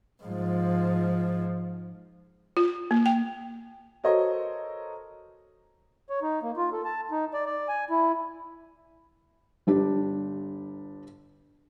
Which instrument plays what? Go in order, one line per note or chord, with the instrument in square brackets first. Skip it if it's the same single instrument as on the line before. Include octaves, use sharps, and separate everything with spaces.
[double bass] G#2 F3
[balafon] F4
A#3
G5
[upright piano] F#4 A4 A#4 C5 C#5 D#5
[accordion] C#5
D#4
A#3
F4
A4
A5
D#4
D5
D5
G#5
E4
[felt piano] G1 D4 G4